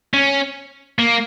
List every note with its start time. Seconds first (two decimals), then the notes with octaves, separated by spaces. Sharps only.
0.14 C#4
0.99 A#3